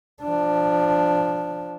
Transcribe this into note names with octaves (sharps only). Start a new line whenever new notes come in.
F3 D4